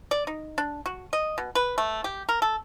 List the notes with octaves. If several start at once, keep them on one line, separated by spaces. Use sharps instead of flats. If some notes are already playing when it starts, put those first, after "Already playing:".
D5
D#4
D4
F#4
D#5
B2
B4
A3
G4
A#4
A4